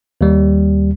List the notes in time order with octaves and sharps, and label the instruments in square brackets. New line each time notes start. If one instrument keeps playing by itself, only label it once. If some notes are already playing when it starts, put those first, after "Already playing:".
[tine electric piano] D#2 G3